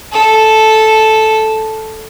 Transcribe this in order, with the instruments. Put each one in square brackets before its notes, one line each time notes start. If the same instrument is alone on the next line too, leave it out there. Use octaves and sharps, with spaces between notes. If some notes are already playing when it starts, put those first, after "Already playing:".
[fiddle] A4